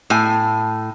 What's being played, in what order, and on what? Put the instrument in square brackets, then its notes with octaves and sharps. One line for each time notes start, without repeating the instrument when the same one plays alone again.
[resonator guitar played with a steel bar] A2 G#5